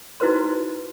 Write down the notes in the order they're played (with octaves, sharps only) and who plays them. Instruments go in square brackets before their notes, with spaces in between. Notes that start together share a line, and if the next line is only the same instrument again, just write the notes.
[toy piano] D#4 E4 F#4 B4 C5 C6